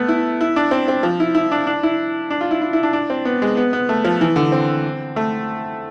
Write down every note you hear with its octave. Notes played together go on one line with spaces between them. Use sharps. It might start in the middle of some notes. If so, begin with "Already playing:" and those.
Already playing: A3 B3
E4
E4
D4
C4
C4
F3
E4
E4
D4
D4
E4
D4
F4
E4
E4
E4
D4
D4
C4
B3
G#3
B3
B3
A3
F3
E3
D3
C4
A3